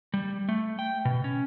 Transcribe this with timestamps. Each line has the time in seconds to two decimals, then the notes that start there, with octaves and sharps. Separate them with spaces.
0.14 G3
0.49 A3
0.79 G5
1.05 B2
1.24 C#4